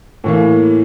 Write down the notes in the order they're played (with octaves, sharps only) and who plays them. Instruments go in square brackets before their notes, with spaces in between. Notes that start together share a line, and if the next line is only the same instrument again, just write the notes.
[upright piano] A2 E3 A#3